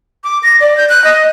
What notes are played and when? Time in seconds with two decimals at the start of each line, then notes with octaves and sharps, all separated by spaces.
0.24 D6
0.43 A#6
0.60 D5
0.77 G6
0.89 F#6
1.04 D#5